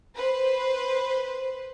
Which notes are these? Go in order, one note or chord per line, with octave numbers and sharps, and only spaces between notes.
B4 C5